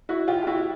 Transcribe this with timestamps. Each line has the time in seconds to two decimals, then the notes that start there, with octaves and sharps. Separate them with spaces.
0.09 E4 F#4
0.28 F4 G4
0.43 G4
0.47 E4 F#4